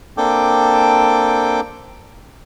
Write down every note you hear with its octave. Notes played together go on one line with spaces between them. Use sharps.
A#3 C4 D4 A4 G5 D6